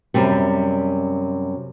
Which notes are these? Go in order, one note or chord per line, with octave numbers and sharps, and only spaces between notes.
F#2 C3 G3